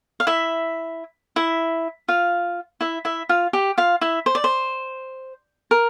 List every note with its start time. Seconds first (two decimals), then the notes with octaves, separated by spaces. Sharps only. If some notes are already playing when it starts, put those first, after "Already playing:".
0.20 F5
0.27 E4 E5
1.36 E4 E5
2.08 F4 F5
2.81 E4 E5
3.05 E4 E5
3.29 F4 F5
3.53 G4 G5
3.78 F4 F5
4.01 E4 E5
4.26 C5
4.35 D5
4.44 C5
5.71 A#4